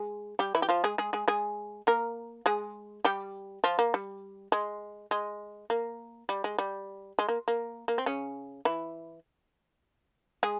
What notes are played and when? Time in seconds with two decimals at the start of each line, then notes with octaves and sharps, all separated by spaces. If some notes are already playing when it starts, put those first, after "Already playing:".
Already playing: G#3 G#4
0.39 G3 G4
0.55 E3 E4
0.62 G4
0.69 F3 F4
0.84 G#3 G#4
0.98 G#3 G#4
1.13 G#3 G#4
1.28 G#3 G#4
1.87 A#3 A#4
2.46 G#3 G#4
3.04 G3 G4
3.64 F3 F4
3.79 A#3
3.94 G3
4.52 G#3
5.11 G#3
5.70 A#3
6.29 G3
6.44 G#3
6.58 G3
7.19 G#3
7.29 A#3
7.48 A#3
7.88 A#3
7.98 C4
8.06 C#3 C#4
8.65 E3 E4
10.43 G#3 G#4